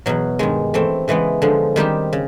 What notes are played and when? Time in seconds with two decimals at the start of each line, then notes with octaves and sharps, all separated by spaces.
0.06 E2 B2 F#3
0.39 G2 D#3 G#3
0.74 E3 A3 C4
1.08 C#3 E3 G#3 B3
1.42 D3 F3 G#3
1.76 D#3 G3 C4 D#4 G4
2.13 C#3